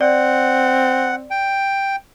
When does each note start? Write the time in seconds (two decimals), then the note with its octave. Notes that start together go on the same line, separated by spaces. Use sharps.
0.01 C4 D5 F#5
1.31 G5